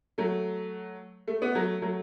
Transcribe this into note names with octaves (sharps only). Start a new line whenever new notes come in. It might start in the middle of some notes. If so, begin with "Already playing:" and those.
F#3 A3
A3
B3
F#3 A3
F#3 A3